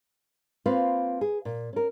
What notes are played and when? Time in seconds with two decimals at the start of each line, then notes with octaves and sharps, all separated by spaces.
0.66 A#3 C4 F4 B4 F5
1.21 G#4
1.45 A#2
1.73 C#4 A#4